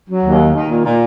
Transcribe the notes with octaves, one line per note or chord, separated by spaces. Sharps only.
F#3
D#2
D#3
D#3
A#2
A#2